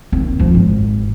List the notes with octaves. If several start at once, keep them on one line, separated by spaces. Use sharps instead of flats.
D#2 C4
F2 F3
G#1